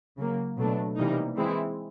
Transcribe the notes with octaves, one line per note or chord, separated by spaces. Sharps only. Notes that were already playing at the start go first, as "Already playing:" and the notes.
C#3 F#3 A#3
B2 F#3 A3 D4
C3 E3 G3 A#3 D#4
E3 G#3 C4 E4